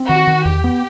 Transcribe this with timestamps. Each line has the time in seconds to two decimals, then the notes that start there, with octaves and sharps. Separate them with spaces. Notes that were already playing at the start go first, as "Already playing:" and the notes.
Already playing: C4
0.09 D#3 F#4
0.27 D#3
0.45 E2 G4
0.64 B3